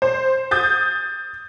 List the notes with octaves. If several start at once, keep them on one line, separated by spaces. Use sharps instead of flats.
C5
D#6 G6 A6